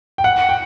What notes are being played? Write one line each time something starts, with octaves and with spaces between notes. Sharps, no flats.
G5
F#5
G5